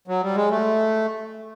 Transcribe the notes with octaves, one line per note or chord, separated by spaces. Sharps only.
F#3
G3
G#3
A3